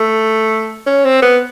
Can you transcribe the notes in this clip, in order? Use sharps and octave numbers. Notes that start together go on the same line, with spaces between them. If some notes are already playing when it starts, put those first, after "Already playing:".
Already playing: A3
C#4
C4
B3